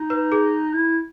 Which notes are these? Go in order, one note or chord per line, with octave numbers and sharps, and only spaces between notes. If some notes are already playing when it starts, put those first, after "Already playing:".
Already playing: D#4
B4
G#4
E4